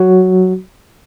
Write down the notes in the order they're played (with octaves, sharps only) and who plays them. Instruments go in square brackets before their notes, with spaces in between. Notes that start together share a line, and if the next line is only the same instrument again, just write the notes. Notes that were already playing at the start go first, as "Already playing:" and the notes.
Already playing: [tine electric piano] F#3 F#4